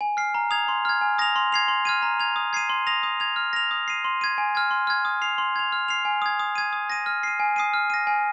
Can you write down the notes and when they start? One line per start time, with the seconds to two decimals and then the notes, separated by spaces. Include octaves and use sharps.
0.01 G#5
0.17 F6 C7
0.34 A#5
0.51 D#6 G#6 F7
0.68 C6
0.85 F6 G#6
1.01 G#5
1.18 D#6 A#6 F7
1.36 C6
1.52 G#6 C7 F7
1.68 C6
1.85 F6 G#6 D#7
2.02 A#5
2.20 G#6 F7
2.36 D#6
2.53 G#6 C7 D#7
2.69 C6
2.87 D#6 A#6 F7
3.03 D#6
3.20 G#6 F7
3.36 F6
3.53 A#6 F7
3.71 D#6
3.88 C7 D#7
4.04 C6
4.21 G#6 D#7
4.38 G#5
4.55 F6 G#6
4.71 C6
4.87 F6 G#6
5.05 D#6
5.22 C7 F7
5.38 C6
5.56 G#6 F7
5.72 F6
5.88 C7 F7
6.05 G#5
6.22 D#6 G#6
6.39 D#6
6.55 G#6 D#7
6.73 D#6
6.90 A#6 D#7
7.06 F6
7.23 C7 D#7
7.40 G#5
7.56 D#6 C7 D#7
7.74 F6
7.90 A#6 D#7
8.07 G#5